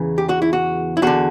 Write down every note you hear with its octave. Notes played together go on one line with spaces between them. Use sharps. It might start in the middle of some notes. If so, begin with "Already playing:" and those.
Already playing: E2 C#3 E3
G4
F#4
E4
F#4
E4
E2 D3 F#4